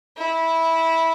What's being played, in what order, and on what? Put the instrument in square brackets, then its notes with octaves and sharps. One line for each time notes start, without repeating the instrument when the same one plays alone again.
[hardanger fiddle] E4